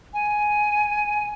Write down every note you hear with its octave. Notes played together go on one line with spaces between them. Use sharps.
G#5